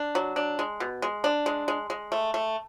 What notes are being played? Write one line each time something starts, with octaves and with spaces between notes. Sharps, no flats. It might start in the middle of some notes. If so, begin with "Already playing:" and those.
Already playing: D4
F#3
D4
G#3
B2
G#3
D4
G#3
G#3
G#3
A3
A3